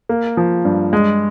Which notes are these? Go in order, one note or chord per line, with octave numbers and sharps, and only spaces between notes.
A#3
F3
G2
G#3